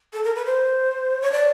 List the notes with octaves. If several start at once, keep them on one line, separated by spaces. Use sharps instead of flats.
A4
A#4
B4
C5
C#5
D5